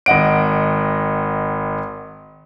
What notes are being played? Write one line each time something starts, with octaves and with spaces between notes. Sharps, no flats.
G#1 D#5 F#5 D7